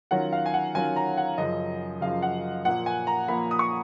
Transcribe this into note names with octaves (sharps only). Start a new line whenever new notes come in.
D#3 F#3 C#4 F4 F#5
F5
G#5
F#5
D#3 F#3 C#4 F4 G#5
A#5
F#5
F#2 C#3 F3 D#5
F#2 C#3 F3 F5
F#5
A#2 F3 A#3 F#5
G#5
A#5
A#2 F3 A#3 B5
D#6
C#6